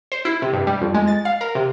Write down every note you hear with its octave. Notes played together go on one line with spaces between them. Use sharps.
C5
E4
C3
G2
G3
F2
G#3
A6
F5
A#4
C3